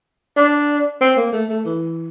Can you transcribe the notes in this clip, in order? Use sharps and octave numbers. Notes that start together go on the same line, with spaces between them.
D4
C4
A#3
A3
A3
E3